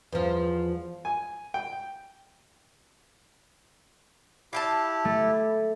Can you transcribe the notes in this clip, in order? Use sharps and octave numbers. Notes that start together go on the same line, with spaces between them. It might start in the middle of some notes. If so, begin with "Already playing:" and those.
E2 F3
G#5
G5
E4 G4 F5 G5 A5
A3